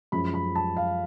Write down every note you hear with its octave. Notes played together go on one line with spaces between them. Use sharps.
F#2 F3 G#3 B5
B5
A5
F5